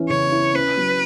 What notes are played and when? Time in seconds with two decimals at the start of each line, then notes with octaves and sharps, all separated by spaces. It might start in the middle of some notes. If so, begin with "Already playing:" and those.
Already playing: E3 C#4
0.09 C#3 C#5
0.32 E4
0.55 C#4 B4
0.77 F#3